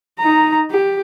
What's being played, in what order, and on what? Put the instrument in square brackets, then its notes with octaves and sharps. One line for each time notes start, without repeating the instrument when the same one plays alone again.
[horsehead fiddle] D#4 A#5
G4